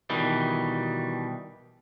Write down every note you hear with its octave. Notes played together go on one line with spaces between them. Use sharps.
B2 D#3 E3 G3